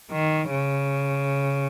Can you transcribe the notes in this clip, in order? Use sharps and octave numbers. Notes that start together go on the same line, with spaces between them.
D#3
C#3